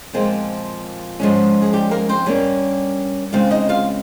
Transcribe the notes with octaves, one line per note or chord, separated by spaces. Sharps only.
A#2 F3 G#3 C4
G#2 F3 G#3 C#4
G#4
G3 G4
A#3 A#4
C4 C5
G2 G3 A#3 C#4 C#5
C#3 G#3 C4 F4 F5
D#4 D#5
F4 F5